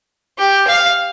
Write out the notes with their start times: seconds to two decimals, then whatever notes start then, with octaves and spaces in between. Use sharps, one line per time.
0.38 G4
0.67 F5